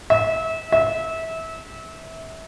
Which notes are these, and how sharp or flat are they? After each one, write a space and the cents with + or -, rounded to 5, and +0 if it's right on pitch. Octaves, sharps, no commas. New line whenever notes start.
E5 -30
E5 -25